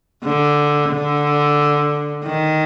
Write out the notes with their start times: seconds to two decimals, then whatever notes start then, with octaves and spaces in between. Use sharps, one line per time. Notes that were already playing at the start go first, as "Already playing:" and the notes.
0.23 D3
0.90 D3
2.24 D#3